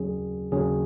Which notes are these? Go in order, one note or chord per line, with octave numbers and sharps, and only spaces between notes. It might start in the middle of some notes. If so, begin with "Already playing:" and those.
Already playing: D#2 C#3 F#3 C#4 G#4
D#2 C#3 F#3 C#4 G#4